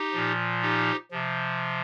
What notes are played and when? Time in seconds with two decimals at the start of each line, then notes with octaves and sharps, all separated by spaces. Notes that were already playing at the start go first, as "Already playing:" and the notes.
Already playing: D#4 G4
0.13 A#2 F3
0.62 D#4 G4
1.11 C3 F3